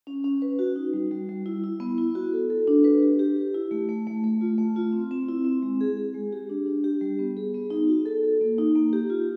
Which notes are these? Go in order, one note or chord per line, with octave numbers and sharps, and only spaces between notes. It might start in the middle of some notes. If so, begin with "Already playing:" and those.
C#4
C#4
B4
F#4
D#4
G3
G3
G3
E4
E4
B3
E4
F#4
A4
A4
D4
B4
G4
G4
G4
E4
A3
A3
A3
A3
F4
A3
F4
C4
C4
E4
C4
G#3
G#4
G#4
G#3
G4
D4
D4
G4
G3
B3
G#4
B3
D#4
F#4
A4
A4
A#3
D#4
A#3
G4
F4